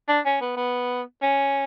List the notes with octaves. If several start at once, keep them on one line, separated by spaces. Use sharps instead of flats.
D4
C#4
B3
B3
C#4